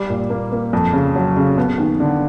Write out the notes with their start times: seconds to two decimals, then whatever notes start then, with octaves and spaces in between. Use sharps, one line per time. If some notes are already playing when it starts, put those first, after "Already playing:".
Already playing: G3
0.10 A#2
0.30 A#3
0.52 A#3
0.73 F2
0.93 C#3
1.16 F#3
1.37 C#3
1.58 B3
1.78 D#2
2.00 D3